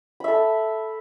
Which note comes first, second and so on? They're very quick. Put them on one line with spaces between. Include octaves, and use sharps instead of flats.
B5 E5 A4